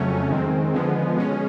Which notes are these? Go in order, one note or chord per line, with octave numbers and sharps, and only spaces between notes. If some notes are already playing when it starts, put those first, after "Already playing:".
Already playing: F2 C#3 F#3 A3 C#4
D#3 G#3 C4
D3 F3 G#3 B3
B2 G#3 C#4